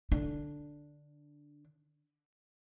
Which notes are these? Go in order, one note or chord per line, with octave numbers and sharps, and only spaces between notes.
D3 D4